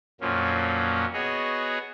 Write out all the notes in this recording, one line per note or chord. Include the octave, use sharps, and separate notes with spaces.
F2 A#2 F3 F#3 A#3 C#4
B3 F#4 G#4 C#5 D#5